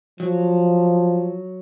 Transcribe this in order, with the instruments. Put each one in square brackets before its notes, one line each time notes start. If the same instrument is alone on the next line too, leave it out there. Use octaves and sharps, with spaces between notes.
[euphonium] F3 [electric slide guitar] F#3